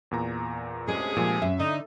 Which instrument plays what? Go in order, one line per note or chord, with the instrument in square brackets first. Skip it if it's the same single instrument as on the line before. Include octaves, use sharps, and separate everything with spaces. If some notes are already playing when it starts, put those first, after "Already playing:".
[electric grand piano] E2 A#2 A#5
[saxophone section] D2 C3 G#4 [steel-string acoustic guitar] G#3 C#4
[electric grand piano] A#2 G#3 [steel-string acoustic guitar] F3
[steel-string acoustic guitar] F#2 [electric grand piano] E5
[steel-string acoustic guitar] D3 [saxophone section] D#4